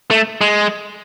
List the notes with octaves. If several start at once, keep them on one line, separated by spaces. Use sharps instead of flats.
A3
G#3